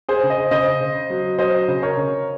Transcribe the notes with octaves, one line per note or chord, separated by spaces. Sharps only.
G#4 C5
C#3
C5 D#5
C#3 C5 D#5
C#3
F#3
F#3 C5 D#5
C#3
A#4 C#5
C#3